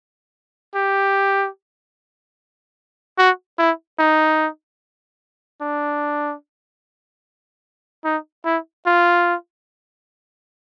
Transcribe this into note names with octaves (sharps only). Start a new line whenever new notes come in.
G4
F#4
E4
D#4
D4
D#4
E4
F4